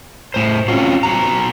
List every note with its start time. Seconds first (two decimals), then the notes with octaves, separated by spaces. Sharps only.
0.34 A2 C5
0.68 C4 C#4 F4 F#4
1.03 B3 F#4 A#5